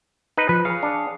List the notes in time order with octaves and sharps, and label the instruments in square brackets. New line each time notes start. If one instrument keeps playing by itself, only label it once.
[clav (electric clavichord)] D#4 B4
[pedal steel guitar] F3 [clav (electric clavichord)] B4
[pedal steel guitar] G#4 C#5 F5
[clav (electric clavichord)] D4